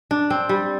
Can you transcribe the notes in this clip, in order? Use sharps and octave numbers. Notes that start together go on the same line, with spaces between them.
D4
C4
G3